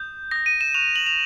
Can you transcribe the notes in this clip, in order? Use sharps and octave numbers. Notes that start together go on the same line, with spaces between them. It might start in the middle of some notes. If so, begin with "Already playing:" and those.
Already playing: D#6 G6
D#6 G6 A#6
D#7
E7
C#6 F#6 F7
F#7
F7